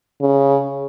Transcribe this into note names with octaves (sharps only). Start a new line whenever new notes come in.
C#3